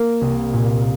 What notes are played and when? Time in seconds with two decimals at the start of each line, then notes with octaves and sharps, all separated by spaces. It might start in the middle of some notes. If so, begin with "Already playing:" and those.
Already playing: A#3
0.21 C2
0.53 A#2